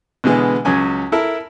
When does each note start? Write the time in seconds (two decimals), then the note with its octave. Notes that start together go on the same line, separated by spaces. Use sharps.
0.24 B2 D3 E3 G#3 B3
0.65 C#2 F#3 C#4 G#5
1.12 E4 A4 A#4 E5